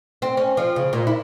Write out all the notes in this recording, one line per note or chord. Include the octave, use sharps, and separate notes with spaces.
C4
C#4
F3
C#3
A#2
E4